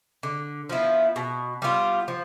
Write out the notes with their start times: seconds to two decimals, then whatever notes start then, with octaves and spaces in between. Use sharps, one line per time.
0.23 D3
0.69 F3 B3 E4
1.16 B2
1.62 G3 B3 F4
2.08 F3